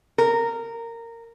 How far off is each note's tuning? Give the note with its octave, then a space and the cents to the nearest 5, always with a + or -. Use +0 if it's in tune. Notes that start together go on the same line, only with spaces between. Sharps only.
A#4 -15